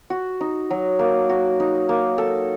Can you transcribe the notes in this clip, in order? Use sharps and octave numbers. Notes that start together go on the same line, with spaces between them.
F#4
D#4
F#3
A#3
F#4
D#4
A#3
A4